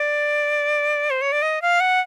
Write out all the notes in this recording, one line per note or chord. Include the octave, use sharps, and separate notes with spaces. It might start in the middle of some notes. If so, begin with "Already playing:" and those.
Already playing: D5
C5
C#5
D5
D#5
F5
F#5